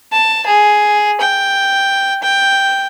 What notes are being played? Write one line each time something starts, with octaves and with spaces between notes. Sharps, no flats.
A5
G#4
G5
G5